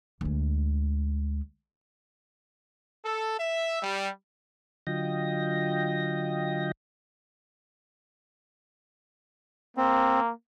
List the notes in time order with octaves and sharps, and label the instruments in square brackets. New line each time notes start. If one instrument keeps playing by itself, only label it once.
[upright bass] D2 G#3
[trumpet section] A4
E5
G3
[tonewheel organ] D3 F#3 F4 D#5 G5 A#6
[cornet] A#3 [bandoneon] C4